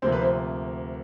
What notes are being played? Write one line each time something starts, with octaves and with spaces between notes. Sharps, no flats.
D2 C3 F3 A#3 C4 C5
B4
C4 C5